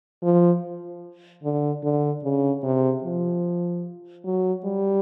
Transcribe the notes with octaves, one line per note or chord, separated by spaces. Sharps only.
F3
D3
D3
C#3
C3
F3
F#3
G3